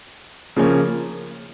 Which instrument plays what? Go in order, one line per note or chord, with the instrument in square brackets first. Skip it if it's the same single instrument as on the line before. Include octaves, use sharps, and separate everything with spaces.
[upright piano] C#3 F3 A#3 C#4